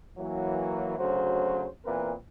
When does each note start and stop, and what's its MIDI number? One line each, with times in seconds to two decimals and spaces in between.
0.18 0.95 52
0.18 0.95 54
0.18 0.95 58
0.99 1.65 38
0.99 1.65 49
0.99 1.65 54
0.99 1.65 72
1.85 2.13 40
1.85 2.13 46
1.85 2.13 52
1.85 2.13 60
1.85 2.13 70
1.85 2.13 71